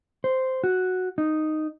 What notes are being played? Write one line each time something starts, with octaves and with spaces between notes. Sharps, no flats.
C5
F#4
D#4